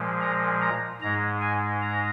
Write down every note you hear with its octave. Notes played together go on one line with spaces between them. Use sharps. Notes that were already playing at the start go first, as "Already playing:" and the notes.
Already playing: A#2 F3 G#3
A#5
A#5
G#2 G#3 A#5
G#5
A#5